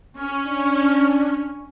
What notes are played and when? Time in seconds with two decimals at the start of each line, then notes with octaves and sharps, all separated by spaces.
0.19 C#4
0.48 D4